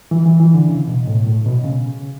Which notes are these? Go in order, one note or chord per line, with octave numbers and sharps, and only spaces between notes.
E3
E3
E3
D3
C#3
B2
A2
A2
B2
C#3